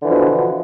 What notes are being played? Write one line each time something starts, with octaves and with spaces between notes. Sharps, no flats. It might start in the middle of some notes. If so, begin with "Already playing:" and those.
B2 D3 E3 F3